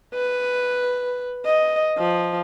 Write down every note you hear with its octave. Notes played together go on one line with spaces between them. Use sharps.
B4
D#5
F3